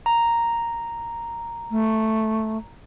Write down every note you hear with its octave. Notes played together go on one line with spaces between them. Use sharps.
A#5
A3